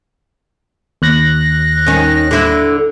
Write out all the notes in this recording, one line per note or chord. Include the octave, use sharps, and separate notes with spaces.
D#2 F#6 A#6
D#3 C#4
D3 E4